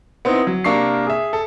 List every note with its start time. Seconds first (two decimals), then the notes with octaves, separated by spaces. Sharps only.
0.25 B3 C4 D#4 E4
0.47 F#3
0.64 C3 A#3 D4 A#4 C#6 C7
1.07 G#4 E5
1.33 A4